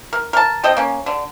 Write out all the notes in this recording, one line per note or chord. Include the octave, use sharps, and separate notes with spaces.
A#4
A#4 A5
C4 A4 D#5 G5
A#3 C#4
D3